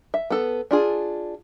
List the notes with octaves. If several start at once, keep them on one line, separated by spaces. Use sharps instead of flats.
E5
B3 A4
D4 F4 G#4